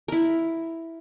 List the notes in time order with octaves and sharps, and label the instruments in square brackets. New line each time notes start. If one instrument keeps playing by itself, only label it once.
[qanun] E4 A#4